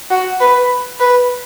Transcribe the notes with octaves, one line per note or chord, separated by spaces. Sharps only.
F#4
B4
B4